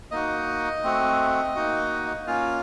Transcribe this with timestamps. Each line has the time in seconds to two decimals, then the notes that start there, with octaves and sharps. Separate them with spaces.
0.11 A#3 D#4 F#4 D#5
0.83 A3 C4 F#4
1.55 A#3 D#4 F#4
2.27 A#3 C#4 F4 F5